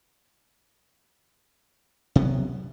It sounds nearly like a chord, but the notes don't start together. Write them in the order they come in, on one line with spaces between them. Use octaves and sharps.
C3 B3 F#3